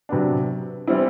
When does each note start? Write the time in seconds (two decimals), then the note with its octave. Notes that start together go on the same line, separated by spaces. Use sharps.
0.09 C3 F#3 B3 D4
0.87 E3 G3 C4 E4